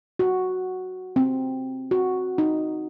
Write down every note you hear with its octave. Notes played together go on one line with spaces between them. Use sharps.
F#4
C4
F#4
D#4